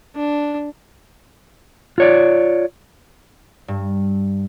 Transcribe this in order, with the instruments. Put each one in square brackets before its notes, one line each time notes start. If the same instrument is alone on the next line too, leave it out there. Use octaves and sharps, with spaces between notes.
[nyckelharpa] D4
[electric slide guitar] F4 C#5 D5
[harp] G2